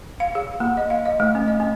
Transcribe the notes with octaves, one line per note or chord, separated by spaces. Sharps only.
F5
G#4
A#3
D#5
F5
D#5
A3
C#4
D#5
C#4